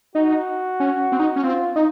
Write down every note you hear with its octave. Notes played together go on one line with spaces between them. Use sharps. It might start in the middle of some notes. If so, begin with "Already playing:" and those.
D#4 F#4
C#4
C4
D#4
C#4
C4 F4
D#4